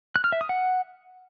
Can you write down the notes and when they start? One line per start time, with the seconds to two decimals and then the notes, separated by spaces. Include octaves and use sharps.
0.16 F#6
0.24 F6
0.32 E5
0.41 D#6
0.49 F#5